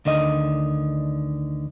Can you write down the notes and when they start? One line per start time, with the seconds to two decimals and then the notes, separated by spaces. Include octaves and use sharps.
0.05 D2 D3 D#3 D#5